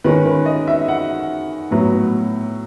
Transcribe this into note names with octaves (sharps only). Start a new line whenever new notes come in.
D#3 G#3 C#4 B4
B4
D#5
E5
F#5
A2 F#3 B3